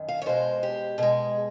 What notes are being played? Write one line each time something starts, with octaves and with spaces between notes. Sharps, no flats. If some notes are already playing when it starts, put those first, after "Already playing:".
Already playing: F#2 D#3
F5
C#5
B2 G#3 C5
G4
B2 G#3 G#4